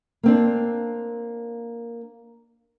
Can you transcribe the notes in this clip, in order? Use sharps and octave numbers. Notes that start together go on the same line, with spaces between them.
A#3 C4 D4